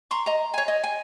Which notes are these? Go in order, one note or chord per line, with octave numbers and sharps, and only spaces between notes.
A#5 C6 C#6
D#5 A#5
C#5 G#5
D#5
G#5